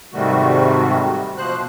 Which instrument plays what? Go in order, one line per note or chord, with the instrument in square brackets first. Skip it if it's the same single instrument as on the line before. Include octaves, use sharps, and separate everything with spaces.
[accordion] G#2 C3 D#3 G3 A3 F#4
B2 F3 C5 F#6